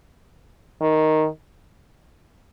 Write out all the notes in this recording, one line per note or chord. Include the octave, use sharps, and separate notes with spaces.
D#3